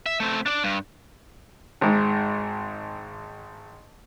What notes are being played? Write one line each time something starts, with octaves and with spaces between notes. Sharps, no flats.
E5
A3 C4
D4 D5
G2
G#1 G#2